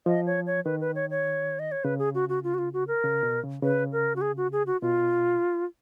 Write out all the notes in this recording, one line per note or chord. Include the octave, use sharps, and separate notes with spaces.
F3 D#5
C#5
C#5
D#3 B4
B4
C#5
C#5
D#5
C#5
C#3 B4
G#4
F#4
F#4
F4
F#4
F4
F#4
A#4
C#3
B2
C#3
C#3 B4
A#4
F#4
G#4
F#4
G#4
F#4
B2 F4